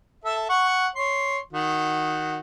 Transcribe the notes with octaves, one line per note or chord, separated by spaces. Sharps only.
A4 E5
F#5 C#6
C#5 C6
D#3 F#4